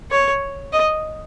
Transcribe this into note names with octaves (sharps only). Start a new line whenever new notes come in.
C#5
D#5